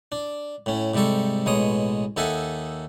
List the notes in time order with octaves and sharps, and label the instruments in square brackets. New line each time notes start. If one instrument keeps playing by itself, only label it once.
[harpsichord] D4
A2 C#4
G#2 C3 G3 A4 C#6
A1 B2 G#3 C#5 D#6
D#2 D#4 A4 E5 F#5 G#5